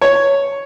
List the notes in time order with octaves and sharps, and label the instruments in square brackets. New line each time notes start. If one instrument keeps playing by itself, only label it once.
[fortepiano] C#5